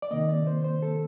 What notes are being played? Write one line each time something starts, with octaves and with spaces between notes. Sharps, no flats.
D5
C3 D#3 A#3 D#5
D5
C5
C5
A4